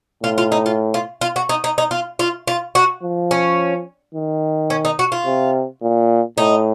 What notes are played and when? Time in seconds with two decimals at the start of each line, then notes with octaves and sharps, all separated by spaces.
0.23 A2 F4
0.38 F4
0.52 D#4
0.66 F4
0.94 F4
1.21 F4
1.36 F#4
1.49 D#4
1.64 D#4
1.78 D#4
1.91 F4
2.19 F4
2.48 F4
2.75 F#4
3.03 F3
3.31 C#4
4.15 D#3
4.70 C#4
4.85 D#4
4.99 F#4
5.12 F4
5.26 C3
5.82 A#2
6.38 A2 D#4